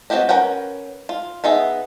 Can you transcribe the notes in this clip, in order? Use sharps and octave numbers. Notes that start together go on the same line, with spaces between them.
B3 C4 F#4 G4 D#5
C#4 A#4 B4 F#5 G5
F4
B3 D#4 G#4 E5